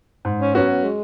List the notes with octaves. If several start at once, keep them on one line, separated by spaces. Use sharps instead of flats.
G#2
C#4
F#3 B3 C#4 F#4
B3
G#3